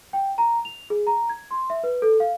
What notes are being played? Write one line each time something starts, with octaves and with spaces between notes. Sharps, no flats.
G5
A#5
F7
G#4
A#5
G#6
C6
E5
B4
A4
F5